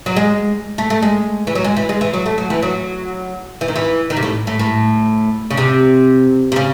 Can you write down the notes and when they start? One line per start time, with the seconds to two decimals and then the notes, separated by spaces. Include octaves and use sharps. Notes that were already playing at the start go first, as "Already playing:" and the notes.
0.06 F#3
0.16 G#3
0.78 A3
0.90 A3
1.02 G#3
1.47 E3
1.55 F#3
1.64 G#3
1.77 E3
1.89 G#3
2.01 E3
2.14 F#3
2.26 A3
2.38 F#3
2.50 E3
2.63 F#3
3.61 E3
3.68 D#3
3.76 E3
4.10 D#3
4.17 C3
4.23 A2
4.47 A2
4.59 A2
5.50 C#3
5.57 C3
6.52 C3
6.56 C#3